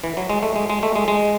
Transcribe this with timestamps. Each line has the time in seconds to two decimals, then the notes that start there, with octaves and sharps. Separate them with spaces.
0.04 E3
0.17 F#3
0.30 G#3
0.43 A3
0.56 G#3
0.70 G#3
0.83 A3
0.96 G#3
1.08 G#3